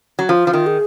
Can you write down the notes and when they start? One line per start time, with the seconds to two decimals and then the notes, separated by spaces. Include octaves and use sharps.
0.19 F#3
0.29 F3 F4
0.47 F3
0.53 D#3
0.67 G#4